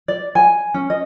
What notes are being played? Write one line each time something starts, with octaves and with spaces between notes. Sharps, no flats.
D5
G#5
C#4
D#5